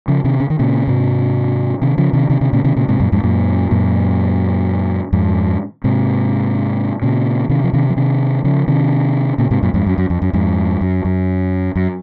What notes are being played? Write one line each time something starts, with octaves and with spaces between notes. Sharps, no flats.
C#3 F3
C3 D#3
C#3
D#3
A#2 C#3
G#2 C3
C3 D#3
C#3 F3
C3 D#3
C3 D#3
C3 D#3
A#2 C#3
C3 D#3
A#2 C#3
G#2 C3
F#2 A#2
F2 G#2
F#2 A#2
F#2 A#2
F2 G#2
G#2 C3
A#2 C#3
C3 D#3
F3
C3 D#3
F3
C3 D#3
C#3 F3
C3 D#3
A#2 C#3
G#2 C3
F#2 A#2
F2 G#2
F#2
F#2
F2
F#2
F2 G#2
F#2
F#2
F#2